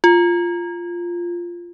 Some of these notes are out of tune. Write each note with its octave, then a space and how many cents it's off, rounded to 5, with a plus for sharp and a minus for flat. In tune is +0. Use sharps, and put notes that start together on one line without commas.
F4 -5